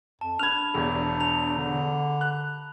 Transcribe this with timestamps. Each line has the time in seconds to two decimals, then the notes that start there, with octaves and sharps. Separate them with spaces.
0.21 F2 A5
0.39 D4 B5 F6 G#6 F7
0.74 E1 E2
1.20 A#5 F7
1.58 D3
2.21 F#6